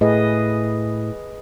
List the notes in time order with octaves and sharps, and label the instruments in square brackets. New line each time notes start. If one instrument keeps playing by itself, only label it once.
[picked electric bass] A2 [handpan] G#4 B4 D#5